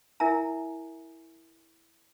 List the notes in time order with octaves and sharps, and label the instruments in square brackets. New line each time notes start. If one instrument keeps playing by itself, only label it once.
[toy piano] E4 A#4 E5 G#5 A#5